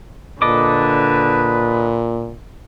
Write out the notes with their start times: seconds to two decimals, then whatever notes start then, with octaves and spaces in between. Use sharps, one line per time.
0.42 A#2 D3 A4 B4 D#5 D6